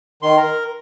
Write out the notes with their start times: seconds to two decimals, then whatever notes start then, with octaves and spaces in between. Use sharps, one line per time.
0.22 D#3 C6
0.37 A#4